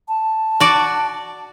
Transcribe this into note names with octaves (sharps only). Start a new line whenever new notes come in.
A5
F#4 D5